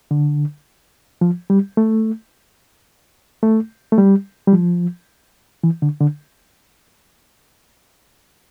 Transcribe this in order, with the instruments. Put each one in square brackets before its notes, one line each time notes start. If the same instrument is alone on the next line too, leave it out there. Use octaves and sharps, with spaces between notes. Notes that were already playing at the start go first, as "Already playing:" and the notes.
[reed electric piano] D3
F3
G3
A3
A3
A3
G3
G3
F3
E3
D3
D3